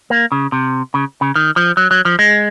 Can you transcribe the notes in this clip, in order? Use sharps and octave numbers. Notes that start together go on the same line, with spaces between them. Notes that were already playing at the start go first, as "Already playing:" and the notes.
A#3
C#3
C3
C#3
C#3
D#3
F3
F#3
F#3
F3
G#3